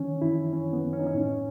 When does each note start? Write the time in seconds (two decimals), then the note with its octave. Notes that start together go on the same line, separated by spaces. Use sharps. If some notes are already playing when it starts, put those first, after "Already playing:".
Already playing: D#3 E3 C#4
0.22 F#2 E4
0.52 F#2 C#4
0.73 B3
0.82 F#2
0.93 C#4
0.99 D#4
1.07 C#4
1.14 A2